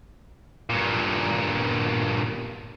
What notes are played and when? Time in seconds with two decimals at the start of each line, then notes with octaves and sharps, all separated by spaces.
0.70 G2 A#2